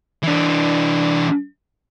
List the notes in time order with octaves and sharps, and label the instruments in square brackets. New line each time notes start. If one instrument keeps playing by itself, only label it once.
[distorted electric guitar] E3 D4